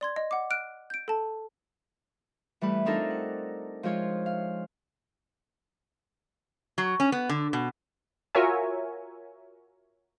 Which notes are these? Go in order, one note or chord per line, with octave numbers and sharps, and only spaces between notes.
D5 C6 G#6
D#5
F#5 D6
F6 F#6 D7
G6 D7
A4 A5
E3 G3 A3 B4
C4 D4 D#4 F4 A4 A#4
F#5
F3 G#3 F4 C#5
F5
F#3
C#4
B3
D3
B2
F4 F#4 A#4 C#5 E5 G#5